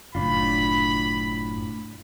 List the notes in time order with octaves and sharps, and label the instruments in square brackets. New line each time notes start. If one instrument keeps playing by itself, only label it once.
[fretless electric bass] F#1 [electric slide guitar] A2 D4 F4 [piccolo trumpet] B5